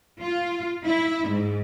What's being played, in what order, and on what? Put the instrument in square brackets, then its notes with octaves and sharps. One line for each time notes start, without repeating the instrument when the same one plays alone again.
[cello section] F4
E4
G#2